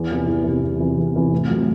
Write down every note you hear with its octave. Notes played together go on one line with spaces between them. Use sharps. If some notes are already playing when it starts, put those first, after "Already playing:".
Already playing: E2
C3 E3
E2
C3 E3
E2
C3 E3
E2
C3 E3
A2
F#3 A3 C4